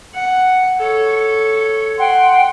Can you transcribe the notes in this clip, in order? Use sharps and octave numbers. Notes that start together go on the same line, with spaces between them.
F#5
A4 C#5
F#5 G5 C6